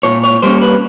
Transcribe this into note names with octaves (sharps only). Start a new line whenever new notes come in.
A#2 C#5
C#5
G3 A#3 C#4 C5
B4